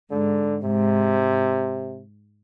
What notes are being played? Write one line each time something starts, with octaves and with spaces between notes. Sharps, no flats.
G#2 D3
G#2 C3